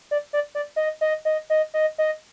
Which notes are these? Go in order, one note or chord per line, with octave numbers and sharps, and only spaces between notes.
D5
D5
D5
D#5
D#5
D#5
D#5
D#5
D#5